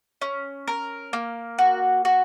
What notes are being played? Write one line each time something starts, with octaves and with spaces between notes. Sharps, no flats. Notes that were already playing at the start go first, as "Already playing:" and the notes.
C#4
A#4
A#3
F#4
F#4